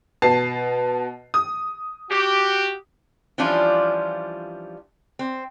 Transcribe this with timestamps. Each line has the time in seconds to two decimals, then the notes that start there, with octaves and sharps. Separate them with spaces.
0.22 B2 A5 C7
1.34 D#6
2.10 F#4 G4
3.38 E3 F3 G3 C#4 D4 F4
5.19 C4